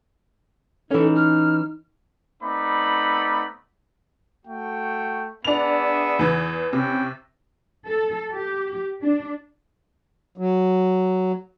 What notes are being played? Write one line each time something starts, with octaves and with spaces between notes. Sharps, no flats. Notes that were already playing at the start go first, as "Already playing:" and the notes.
E3 C#4 D#4 A4
F6
A3 B3 C4 D#4 D5 B5
A3 F#4 G5
B3 D4 G#4 E5 F7
E2 E3
C3 C#4 E4 G5
A4
G4
D4
F#3